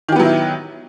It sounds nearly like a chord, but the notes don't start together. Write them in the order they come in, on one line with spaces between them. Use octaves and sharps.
D#3 G4 B3 F#3 E4